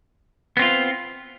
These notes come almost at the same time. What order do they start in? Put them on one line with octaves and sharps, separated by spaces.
B3 C4 F4